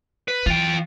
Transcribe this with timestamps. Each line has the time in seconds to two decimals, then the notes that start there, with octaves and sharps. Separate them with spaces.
0.28 B4
0.46 E3 F4 G5